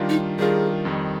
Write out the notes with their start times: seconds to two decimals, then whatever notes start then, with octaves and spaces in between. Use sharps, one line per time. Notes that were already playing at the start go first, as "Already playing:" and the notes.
Already playing: D#3 G3 D4 F4 A#4
0.09 D#4
0.39 D#3 G3 D4 F4 G#4 A#4
0.85 F2 D#3 G3